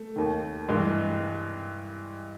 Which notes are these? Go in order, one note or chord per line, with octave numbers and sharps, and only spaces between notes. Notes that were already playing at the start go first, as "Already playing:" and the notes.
Already playing: A3
D#2 D#3
G2 E3 G#3